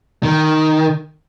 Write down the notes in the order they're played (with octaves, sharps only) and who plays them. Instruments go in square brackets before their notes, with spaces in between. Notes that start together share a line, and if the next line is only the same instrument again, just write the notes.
[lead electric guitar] D#3